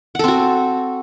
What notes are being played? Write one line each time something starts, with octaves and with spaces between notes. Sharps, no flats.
C4 F#4 A4 F#5